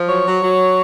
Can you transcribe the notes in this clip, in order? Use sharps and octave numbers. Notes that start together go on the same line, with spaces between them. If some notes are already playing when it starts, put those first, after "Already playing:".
Already playing: F3
F#3 C#5
F#3
F#3